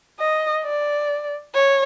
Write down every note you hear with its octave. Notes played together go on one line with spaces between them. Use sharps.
D#5
D5
C#5